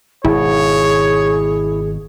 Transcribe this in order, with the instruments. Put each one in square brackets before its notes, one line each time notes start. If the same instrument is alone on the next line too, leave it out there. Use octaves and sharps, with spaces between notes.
[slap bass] G#1 B2 [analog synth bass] E4 [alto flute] G#4 [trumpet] C#5